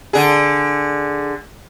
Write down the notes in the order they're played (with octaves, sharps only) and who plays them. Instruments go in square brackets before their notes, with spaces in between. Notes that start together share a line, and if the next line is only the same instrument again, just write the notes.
[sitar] D3 G#4